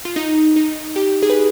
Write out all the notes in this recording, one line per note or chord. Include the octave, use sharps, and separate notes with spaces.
F4
D#4
D#4
G4
G#4
B4